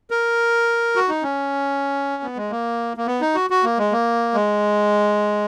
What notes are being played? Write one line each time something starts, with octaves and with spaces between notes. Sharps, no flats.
A#4
F#4
D#4
C#4
B3
G#3
A#3
A#3
B3
D#4
F#4
F#4
A#3
G#3
A#3
G#3